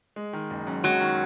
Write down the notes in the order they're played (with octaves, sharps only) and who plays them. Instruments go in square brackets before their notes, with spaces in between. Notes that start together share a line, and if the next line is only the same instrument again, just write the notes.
[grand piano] G#3
D#3
F#1
F#2
[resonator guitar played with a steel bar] F#3 [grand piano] G#3
[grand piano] D#3